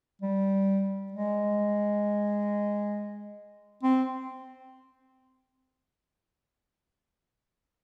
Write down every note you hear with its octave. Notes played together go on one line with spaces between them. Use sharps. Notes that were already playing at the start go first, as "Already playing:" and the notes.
G3
G#3
C4